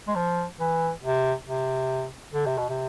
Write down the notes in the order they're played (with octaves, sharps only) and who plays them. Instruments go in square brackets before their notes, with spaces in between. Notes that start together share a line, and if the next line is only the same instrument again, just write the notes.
[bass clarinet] G#3
F3
E3
C3
C3
D3
C3
B2
C3